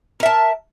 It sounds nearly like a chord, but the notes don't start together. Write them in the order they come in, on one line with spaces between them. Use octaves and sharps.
A#4 E5 A5